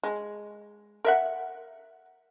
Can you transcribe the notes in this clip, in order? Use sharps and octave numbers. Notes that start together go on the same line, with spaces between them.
G#3
A#4 E5 F#5